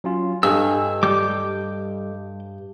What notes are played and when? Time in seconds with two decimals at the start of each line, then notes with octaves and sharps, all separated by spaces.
0.04 F#3 C#4 F4
0.43 G2 A4 D#5 G#5 E6
1.03 G3 D6 G6